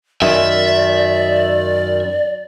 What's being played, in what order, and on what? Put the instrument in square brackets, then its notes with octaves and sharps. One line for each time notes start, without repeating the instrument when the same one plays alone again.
[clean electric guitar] F#2 D#3 [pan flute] D5 [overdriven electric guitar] E5